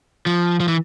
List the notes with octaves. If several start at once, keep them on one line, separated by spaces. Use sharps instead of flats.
F3
F3
E3